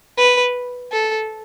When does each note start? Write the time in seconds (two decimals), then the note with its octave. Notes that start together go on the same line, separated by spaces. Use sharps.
0.18 B4
0.92 A4